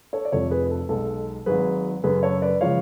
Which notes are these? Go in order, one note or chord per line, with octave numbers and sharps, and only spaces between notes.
A4 C#5
D5
F1 F2 F3 A4 C#5
G#4 B4
A4
B1 B2 G#3 A4
G#1 G#2 F#3 G#4 B4
F#2 C#3 F#3 A3 G#4 B4
A4 C#5
B4 D5
C#3 F3 G#3 C#5 F5